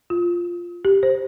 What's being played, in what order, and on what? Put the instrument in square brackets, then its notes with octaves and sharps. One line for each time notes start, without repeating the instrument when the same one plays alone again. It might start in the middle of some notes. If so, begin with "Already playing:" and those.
[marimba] F4
G4
C5